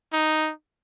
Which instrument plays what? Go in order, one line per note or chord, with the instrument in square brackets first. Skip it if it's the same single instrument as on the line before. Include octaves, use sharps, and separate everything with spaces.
[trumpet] D#4